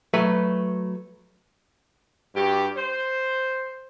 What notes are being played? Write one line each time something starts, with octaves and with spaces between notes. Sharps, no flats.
F#3 A3 B4
G2 F#4 G4
C5